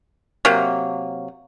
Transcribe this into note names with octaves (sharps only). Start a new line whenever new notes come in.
C3 F#3 A#3